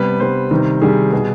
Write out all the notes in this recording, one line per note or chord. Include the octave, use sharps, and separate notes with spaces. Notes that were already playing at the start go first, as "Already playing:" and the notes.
Already playing: C3 G3 B3 B4
C3 G3 B3 C5
C3 D#3 G3
C3 D#3 G3 G#4
B2 G3 B3